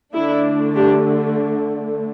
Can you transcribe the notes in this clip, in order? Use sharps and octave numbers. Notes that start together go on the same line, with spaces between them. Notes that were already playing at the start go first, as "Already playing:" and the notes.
D3 A3 D4 E4
D4 G4